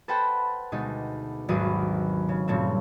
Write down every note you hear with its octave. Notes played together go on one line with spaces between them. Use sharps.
A4 B4 C5 F#5 G5 B5
D2 B2 G#3 D#4
G#1 D#2 F#3 D4 B4 D#6
C#3
G2 A#2 C#3 A3 C4